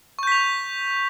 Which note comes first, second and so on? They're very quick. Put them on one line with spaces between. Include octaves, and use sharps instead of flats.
C#6 G6 B6 F7